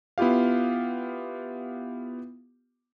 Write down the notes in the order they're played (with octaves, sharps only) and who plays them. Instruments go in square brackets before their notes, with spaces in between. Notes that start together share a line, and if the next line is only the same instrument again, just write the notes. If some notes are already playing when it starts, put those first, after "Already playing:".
[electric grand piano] B3 E4 F4 G4 F5